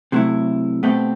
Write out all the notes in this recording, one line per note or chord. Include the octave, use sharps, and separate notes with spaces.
C3 F#3 A3 E4
B2 A3 C4 G4